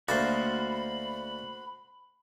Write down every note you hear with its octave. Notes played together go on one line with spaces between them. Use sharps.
D2 A#3 F#4 C5 A5 B5